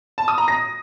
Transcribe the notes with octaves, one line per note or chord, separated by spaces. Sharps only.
A5
D#6
A#5
A#6